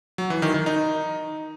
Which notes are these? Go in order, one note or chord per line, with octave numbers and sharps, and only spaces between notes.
F#3
E3
D#3
D#3
D#4